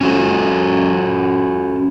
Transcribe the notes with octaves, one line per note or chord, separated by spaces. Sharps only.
C#4 F#4 A4